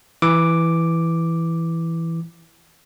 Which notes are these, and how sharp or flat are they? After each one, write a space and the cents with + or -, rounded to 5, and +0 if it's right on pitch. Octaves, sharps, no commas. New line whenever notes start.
E3 +0 D6 +0